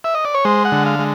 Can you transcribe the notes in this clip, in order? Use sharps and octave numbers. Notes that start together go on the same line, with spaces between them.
E5
D#5
D5
C#5
G#3 C5
F#5
D3
F5
G#3